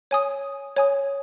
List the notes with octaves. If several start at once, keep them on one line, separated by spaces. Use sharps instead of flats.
C#5 G#5 D#6
C#5 G#5 D#6